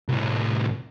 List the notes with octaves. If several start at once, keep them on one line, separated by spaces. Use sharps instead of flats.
C2 A2